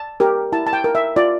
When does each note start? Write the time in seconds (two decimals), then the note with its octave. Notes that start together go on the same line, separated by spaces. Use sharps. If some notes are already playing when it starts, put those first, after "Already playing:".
Already playing: A5
0.20 G4 A#4
0.52 E4 A5
0.67 A5
0.73 G5
0.84 A#4
0.95 E5
1.16 F4 D5